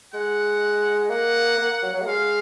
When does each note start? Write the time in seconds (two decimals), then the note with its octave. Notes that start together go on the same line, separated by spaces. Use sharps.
0.14 G#3 F#5
1.10 A#3 F#5
1.58 A#3
1.83 F#3
1.94 F#3
2.02 A#3
2.06 G#3 F5